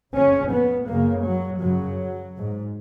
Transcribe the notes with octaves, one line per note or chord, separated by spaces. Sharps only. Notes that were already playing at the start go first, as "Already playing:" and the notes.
F2 C#3 C#4
B3
F#2 C#3 A#3
F#3
F#2 C#3 F#3
G#2